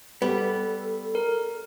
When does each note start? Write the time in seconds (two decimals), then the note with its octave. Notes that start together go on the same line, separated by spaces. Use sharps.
0.22 G3 B3 A4
1.15 A#4